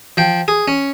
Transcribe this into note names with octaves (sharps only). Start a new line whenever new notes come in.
F3 G5
G#4
C#4